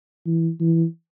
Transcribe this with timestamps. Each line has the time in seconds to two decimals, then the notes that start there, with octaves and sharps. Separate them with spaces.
0.26 E3
0.60 E3